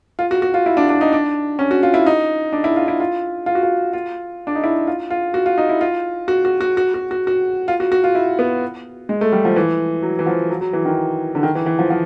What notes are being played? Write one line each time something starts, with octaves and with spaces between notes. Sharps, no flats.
F4
F#4
F#4
F4
E4
D4
D4
D#4
D4
C#4
F#4
F4
E4
D#4
D4
E4
F4
E4
F4
F4
F#4
F4
F4
D4
D#4
E4
F4
F4
F#4
F4
D#4
E4
F4
F#4
F#4
F#4
F#4
F#4
F#4
F#4
F4
F#4
F#4
F4
E4
B3
G#3
A3
G3
F3
E3
F#3
E3
F3
F#3
F#3
E3
D#3
D3
D#3
E3
E3
F3
F3